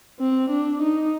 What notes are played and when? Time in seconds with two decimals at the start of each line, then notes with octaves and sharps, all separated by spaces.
0.20 C4
0.50 D4
0.82 D#4